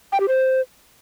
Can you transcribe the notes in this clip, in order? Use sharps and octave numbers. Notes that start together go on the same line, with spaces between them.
G5
G4
C5